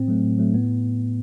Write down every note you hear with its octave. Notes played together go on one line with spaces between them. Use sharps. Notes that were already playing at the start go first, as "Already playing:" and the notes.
Already playing: A2 C4
F#3 A3
A2
F#3 A3
A2 B3